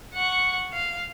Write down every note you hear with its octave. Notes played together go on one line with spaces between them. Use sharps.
F#5 C#6
F5